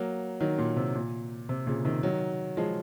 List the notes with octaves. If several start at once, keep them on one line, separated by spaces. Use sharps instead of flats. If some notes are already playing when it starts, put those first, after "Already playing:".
Already playing: F#3 A#3
D#3 F#3
A#2
C3
A#2
C3
A#2 C#3
C3 D#3
D#3 F#3
F3 G#3